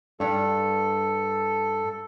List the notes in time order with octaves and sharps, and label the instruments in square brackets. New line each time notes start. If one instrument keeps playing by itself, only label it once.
[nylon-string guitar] G2 [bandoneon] A4